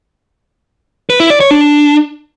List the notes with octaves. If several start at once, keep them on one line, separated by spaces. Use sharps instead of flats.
B4
E4
D5
C#5
D4